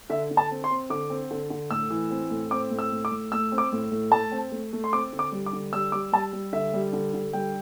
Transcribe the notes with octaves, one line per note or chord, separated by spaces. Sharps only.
D3 E5
D3
A5
C4
C6
C4
D3 D6
C4
D3
D3
A2 E6
E3
C4
A2
C4 D6
A2
E6
A2
D6
A2
A3 E6
C4
D6
A2
A2
A3 A5
C4
A3
A3
C6
C4 D6
D3
D6
G3
D6
D3
G3 E6
G3 D6
G3 A5
G3
D3 E5
G3
D3
D3
G3 G5